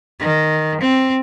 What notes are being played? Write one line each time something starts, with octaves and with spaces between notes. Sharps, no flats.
D#3
C4